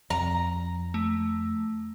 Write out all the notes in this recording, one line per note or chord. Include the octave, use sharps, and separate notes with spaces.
F2 A#5
A3